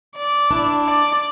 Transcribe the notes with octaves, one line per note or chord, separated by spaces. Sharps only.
D5
D4 E4
D5